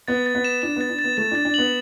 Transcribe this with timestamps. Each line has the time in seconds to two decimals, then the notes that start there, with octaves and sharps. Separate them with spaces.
0.08 B3 A6
0.26 A6
0.35 B3
0.44 E7
0.62 D4 E7
0.76 B3 A6
0.89 D4
0.99 A6
1.04 B3
1.17 A3 A6
1.32 D4 A6
1.45 D4
1.54 B3 F#7